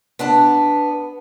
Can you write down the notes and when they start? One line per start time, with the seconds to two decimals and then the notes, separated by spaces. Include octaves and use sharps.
0.19 B3 D4 A5